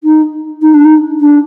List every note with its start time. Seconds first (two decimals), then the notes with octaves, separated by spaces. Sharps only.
0.04 D#4
0.62 D#4
0.74 D4
0.84 D#4
1.20 D4